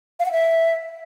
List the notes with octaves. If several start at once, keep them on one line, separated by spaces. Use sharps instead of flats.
F5
F#5
E5